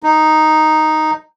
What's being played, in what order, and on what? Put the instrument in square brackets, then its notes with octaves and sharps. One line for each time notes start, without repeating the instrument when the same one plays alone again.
[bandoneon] D#4